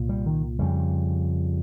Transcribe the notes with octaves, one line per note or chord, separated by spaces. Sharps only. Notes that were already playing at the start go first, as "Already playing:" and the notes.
Already playing: C2 A#2
G3
D#3
F2 C#3 G3